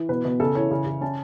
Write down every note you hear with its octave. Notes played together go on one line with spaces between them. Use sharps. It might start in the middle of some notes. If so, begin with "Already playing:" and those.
Already playing: E3
B2 B4
B2
C#3 A4
E3 C#5
C#3
C#3
C#4 A5